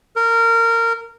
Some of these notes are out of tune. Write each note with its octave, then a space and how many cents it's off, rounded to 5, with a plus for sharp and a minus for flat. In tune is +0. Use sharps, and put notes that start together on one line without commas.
A#4 -20